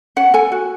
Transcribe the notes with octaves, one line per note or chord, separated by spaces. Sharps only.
C#4 F#5
A4 G#5
F#4